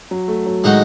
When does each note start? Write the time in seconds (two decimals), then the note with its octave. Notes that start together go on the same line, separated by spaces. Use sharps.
0.11 F#3
0.28 A3
0.46 F#3
0.64 A2 D#3 G#3 D#4 F#4